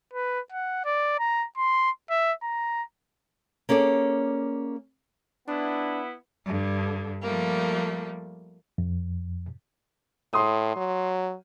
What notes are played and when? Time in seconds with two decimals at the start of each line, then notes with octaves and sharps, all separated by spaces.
0.13 B4
0.52 F#5
0.85 D5
1.19 A#5
1.57 C6
2.10 E5
2.42 A#5
3.69 A#3 C#4 G#4 A4 D5
5.48 B3 D4 E4
6.46 G2 D3
7.23 F3 G3 A3 A#3
8.78 F2
10.33 A2 C6 D#6
10.76 F#3